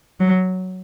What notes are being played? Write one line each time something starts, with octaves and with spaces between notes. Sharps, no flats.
F#3